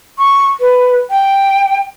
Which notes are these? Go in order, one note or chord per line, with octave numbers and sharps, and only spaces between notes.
C#6
B4
G5